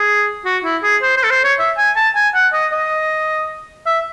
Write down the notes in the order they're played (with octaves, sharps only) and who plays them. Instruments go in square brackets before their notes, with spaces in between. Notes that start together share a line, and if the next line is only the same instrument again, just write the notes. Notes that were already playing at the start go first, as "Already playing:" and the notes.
Already playing: [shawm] G#4
F#4
E4
G#4
C5
C5
A4
C5
C#5
E5
G#5
A5
G#5
F#5
D#5
D#5
E5